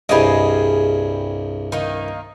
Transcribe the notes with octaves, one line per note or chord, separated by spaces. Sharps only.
C2 G2 G3 G#4 D#5
D#3 A#3 D#4